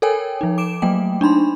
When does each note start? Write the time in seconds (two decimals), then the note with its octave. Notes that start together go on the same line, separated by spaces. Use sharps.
0.02 A4 A#4 C#5 G5 G#5
0.41 F3 D#4
0.58 D6 D7 E7
0.82 F#3 A3 A#3 G5
1.21 D4 D#4 B5 C6